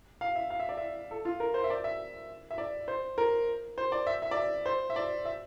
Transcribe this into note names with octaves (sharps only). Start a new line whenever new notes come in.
F5
E5
F5
E5
D5
E5
A4
F4
A#4
C5
E5
D5
E5
E5
D5
C5
A#4
C5
D5
E5
E5
D5
E5
C5
E5
D5
E5